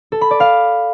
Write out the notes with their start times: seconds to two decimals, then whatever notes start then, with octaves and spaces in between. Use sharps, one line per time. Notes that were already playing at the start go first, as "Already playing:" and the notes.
0.12 A4
0.21 B5
0.31 D5
0.40 F5